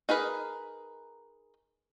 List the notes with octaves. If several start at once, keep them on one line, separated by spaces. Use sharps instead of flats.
D#4 G#4 A#4 B4